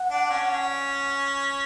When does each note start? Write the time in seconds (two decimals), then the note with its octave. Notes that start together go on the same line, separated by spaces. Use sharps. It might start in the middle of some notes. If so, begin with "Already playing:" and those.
Already playing: F#5
0.10 D4
0.30 C#4